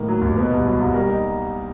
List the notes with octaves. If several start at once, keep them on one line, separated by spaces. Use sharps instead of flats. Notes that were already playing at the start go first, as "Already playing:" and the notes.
Already playing: A2 D#3 A#3 A#4
F#3
D#2
B2 B3 B4
C2
F#3
C2
G3 A#3 A#4
D#4